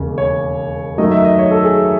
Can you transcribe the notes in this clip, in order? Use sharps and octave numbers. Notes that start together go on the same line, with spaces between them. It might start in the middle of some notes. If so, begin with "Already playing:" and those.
Already playing: E1 D#2 C#3
C#5
F#2 D#3 F#3 A3 D#5
E5
D#5
C#5
A4
G#4